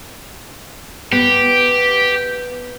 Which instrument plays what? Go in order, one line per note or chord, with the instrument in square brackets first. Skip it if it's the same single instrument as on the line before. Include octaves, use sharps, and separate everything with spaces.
[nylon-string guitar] B3 [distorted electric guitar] G4